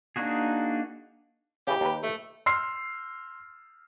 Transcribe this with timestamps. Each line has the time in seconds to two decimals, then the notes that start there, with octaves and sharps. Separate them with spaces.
0.16 A#3 D4 D#4 F#4 G#4
1.67 C#3 E3 G4
1.81 D#2 B4
2.03 A3
2.46 C6 E6 F6 C7